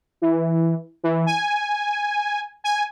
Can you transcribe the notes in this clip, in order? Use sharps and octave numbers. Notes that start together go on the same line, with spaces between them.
E3
E3
G#5
G#5